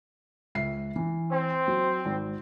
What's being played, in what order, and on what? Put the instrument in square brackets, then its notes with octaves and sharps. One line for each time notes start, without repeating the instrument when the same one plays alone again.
[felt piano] C#2 E5 C7
E3
[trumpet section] C4
[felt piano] F#3
G#1